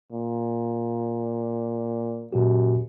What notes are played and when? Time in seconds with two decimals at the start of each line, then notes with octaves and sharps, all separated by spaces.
0.12 A#2
2.33 F#2 A#2 F#4 G4